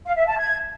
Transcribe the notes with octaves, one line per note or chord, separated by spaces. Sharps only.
F5
E5
A5
G#6